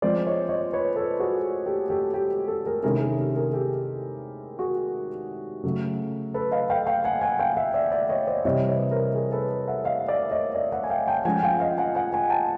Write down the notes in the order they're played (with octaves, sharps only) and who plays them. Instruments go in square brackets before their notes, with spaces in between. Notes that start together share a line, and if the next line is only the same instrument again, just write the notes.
[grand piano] F3 G#3 C4 F4 C5 D5
C#5 D#5
C#5 D#5
B4 C#5
A4 B4
F#4 G#4
G4 A4
G4 A4
G4
G4 A4
G#4 A#4
C3 D#3 G#3 C#4 E4 G#4 A#4
G#4 A#4
G4 A4
G#4 A#4
G4 A4
F#4 G#4
C#3 F#3 A3
A4 B4
D#5 F5
F5 G5
F5 G5
F#5 G#5
F#5 G#5
F5 G5
E5 F#5
D5 E5
D5 E5
C#5 D#5
C5 D5
C3 E3 G3 C4 E4 C#5 D#5
B4 C#5
A#4 C5
G#4 A#4
A4 B4
E5 F#5
D#5 F5
D5 E5
C#5 D#5
D5 E5
E5 F#5
G#5
F5 G5
G5 A5
F3 G#3 C#4 F4 F#5 G#5
F5 G5
D#5 F5
F#5 G#5
F#5 G#5
F#5 G#5
G5 A5